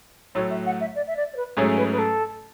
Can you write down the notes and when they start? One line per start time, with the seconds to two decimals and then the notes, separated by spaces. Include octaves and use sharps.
0.35 A2 F#3 A3 C#5
0.50 E5
0.66 F#5
0.81 E5
0.96 D5
1.07 E5
1.17 D5
1.33 C#5
1.36 B4
1.57 G#2 F#3 A3 C#4 G#4 C#5
1.77 B4
1.92 B4
1.99 A4